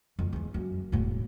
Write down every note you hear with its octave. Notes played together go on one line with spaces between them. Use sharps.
F2
E2 G#2
F#2
E1 A2